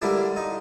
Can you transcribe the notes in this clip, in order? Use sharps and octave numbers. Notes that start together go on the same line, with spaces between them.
D3 G3 A#3 D4 E4
D#4